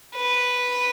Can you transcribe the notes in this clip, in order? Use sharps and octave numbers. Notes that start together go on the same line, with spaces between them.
B4